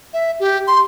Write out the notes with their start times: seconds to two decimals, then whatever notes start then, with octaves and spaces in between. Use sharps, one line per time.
0.13 E5
0.40 G4
0.68 C6